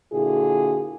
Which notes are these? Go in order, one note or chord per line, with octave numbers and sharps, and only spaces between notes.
A#2 D3 E4 F#4 G#4